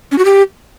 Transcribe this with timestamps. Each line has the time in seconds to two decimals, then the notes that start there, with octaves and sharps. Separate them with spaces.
0.12 C#4
0.18 F#4
0.25 G4